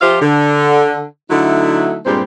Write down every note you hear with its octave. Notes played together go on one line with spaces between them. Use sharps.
F3 F4 G4 C5 E5 F5
D3
D3 F#3 A3 D#4 E4
G2 A#2 G3 G#3 C4